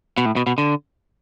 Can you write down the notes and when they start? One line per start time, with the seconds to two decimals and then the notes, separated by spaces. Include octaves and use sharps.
0.18 B2
0.25 A2
0.36 B2
0.47 B2
0.58 D3